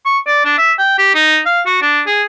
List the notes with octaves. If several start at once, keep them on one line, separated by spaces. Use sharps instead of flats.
C#6
D5
D4
E5
G5
G4
D#4
F5
F#4
D4
G#4